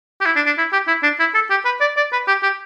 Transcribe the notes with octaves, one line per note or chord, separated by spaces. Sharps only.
G4
E4
D4
D4
E4
G4
E4
D4
E4
A4
G4
B4
D5
D5
B4
G4
G4